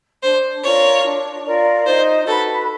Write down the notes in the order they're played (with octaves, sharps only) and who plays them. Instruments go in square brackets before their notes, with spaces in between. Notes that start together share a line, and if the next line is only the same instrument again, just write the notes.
[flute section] D4 [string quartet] C5
[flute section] F4 A#4 D5 [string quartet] C#5
[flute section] D4
F4 A#4 D5
[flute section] D#4 [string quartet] C5
[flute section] F#4 B4 [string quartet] A4